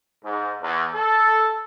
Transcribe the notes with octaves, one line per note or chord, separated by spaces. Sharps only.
G#2
E2
A4